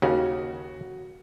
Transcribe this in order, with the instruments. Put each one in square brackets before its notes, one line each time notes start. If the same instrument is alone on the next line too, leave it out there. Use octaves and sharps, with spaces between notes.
[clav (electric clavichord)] D#2 C#3 [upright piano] F#4